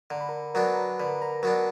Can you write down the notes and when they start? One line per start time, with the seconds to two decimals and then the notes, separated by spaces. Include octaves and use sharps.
0.10 D3 A#5
0.21 B5
0.29 A#4 A#5
0.54 F#3 B3 D4 A#4 A#5
1.00 D3 B4 B5
1.22 A#4 A#5
1.43 F#3 B3 D4 A#4 A#5